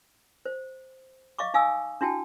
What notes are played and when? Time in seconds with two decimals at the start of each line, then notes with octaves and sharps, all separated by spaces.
0.46 C5
1.39 D#5 F5 C#6 D6
1.54 D#4 F5 G#5 D#6 E6
2.01 D4 E4 F#4 G5 A5